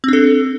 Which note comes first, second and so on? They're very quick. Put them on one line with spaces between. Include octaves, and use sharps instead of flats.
C4 D4 A4